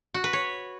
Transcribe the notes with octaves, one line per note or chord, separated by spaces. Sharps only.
F#4
B4
C#5